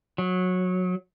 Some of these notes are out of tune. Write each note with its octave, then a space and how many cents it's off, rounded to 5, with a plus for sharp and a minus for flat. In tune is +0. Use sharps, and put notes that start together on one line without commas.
F#3 -15